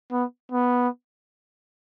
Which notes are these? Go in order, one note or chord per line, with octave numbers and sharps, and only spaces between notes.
B3
B3